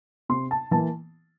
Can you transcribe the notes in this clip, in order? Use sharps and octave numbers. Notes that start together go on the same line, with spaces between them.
C3 C6
A5
E3 A#3 A5